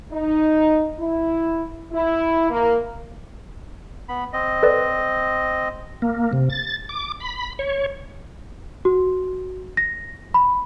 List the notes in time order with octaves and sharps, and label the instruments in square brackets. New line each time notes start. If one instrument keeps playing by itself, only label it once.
[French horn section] D#4
E4
E4
A#3
[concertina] B3 B5
C4 D#5
[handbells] A4 B4 D5
[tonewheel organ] A#3
C3
A6
D6
B5
C#5
[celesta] F#4
A#6
B5